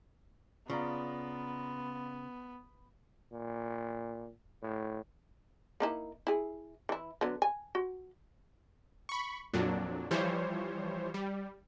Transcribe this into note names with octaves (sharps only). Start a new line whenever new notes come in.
C#3 B3 F4 D5 A#5
A#2
A2
A#3 D#4 E4
E4 G#4
E3 E4
D3 F#3 B3
G#5
F#4
B5 C#6
F2 A#2 F#3 D4
E3 F3 G3 C5 C#5
G3